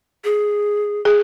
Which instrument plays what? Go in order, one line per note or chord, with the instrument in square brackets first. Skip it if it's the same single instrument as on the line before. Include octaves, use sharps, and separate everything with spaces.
[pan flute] G#4
[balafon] G#4